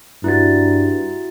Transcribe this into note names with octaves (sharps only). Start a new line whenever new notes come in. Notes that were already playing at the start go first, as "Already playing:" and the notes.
G2 E4 F#4 A6